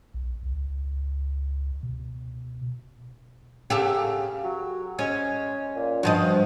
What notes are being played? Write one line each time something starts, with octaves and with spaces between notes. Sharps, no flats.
B1
C#2
B2
C#3 G4 A4 A#4
F#3
G#3 C#4
A#2
G2 F3 F#4 D#5